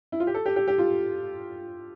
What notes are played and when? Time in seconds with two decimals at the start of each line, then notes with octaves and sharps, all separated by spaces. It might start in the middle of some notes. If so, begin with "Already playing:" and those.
0.12 E4
0.20 F4
0.27 G4
0.34 A4
0.46 G4
0.56 G4
0.68 G4
0.78 F4